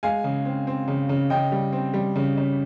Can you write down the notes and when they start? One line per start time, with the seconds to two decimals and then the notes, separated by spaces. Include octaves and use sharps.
0.03 G#3 F5 G#5
0.24 C#3
0.45 C4
0.67 C4
0.88 C#3
1.09 C#3
1.30 C#3 D#5 G5
1.52 G3
1.73 C4
1.94 G3
2.16 C#3
2.37 C#3